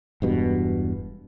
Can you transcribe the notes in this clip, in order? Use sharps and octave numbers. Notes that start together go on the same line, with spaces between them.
E1 G2 B2